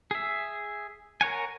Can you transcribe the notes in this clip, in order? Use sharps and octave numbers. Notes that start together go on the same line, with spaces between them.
G#4 E5
A#4 C#5 F#5 G#5